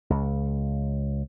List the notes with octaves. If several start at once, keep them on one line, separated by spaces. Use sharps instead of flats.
C#2